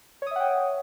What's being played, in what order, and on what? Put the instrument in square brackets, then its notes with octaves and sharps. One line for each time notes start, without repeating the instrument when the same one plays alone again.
[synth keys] C#5
D#6
E5
F#5
G5